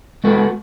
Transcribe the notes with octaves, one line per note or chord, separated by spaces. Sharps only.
G#3 B3 F#4 A4